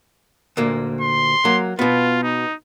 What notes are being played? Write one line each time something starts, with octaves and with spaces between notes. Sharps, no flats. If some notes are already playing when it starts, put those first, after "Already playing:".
D2 A#2 A#3
C6
F#3 A#3
B2 B3 F4
D#4